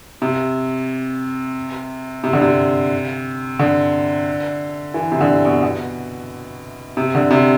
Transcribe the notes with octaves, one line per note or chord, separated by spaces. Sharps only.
C3
C3
D3
C3
D3
E3
C3
D3
C3
B2
B2
C3
D3
C3